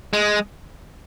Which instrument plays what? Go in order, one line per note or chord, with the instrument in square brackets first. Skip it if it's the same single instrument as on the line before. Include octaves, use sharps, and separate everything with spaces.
[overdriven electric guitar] G#3